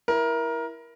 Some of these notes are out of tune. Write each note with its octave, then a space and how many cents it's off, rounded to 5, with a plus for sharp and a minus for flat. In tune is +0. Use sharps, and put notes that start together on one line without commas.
E4 +0 A#4 +20